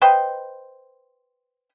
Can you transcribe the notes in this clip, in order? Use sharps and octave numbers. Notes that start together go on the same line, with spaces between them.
B4 C5 D#5 G5